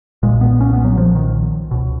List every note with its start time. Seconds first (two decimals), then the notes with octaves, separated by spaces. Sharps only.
0.23 B1 A#2 G#3
0.41 B3
0.61 C#4
0.73 B3
0.84 F#3
0.98 F3
1.15 D#3
1.71 C#2 B2